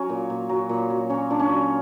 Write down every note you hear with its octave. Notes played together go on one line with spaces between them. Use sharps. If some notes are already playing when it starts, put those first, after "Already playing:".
Already playing: F#3 C#4
A#2
A#2
F#3
A#2
F#3
A#2 C#4
A#2 D4
C#4
F#3